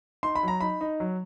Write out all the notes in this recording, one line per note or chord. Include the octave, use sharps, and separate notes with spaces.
D#4 C6
B5
F#3 A#5
D#4 B5
D#4
F#3